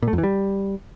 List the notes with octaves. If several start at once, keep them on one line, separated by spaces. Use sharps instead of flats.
A#2
A3
F2
E3
G3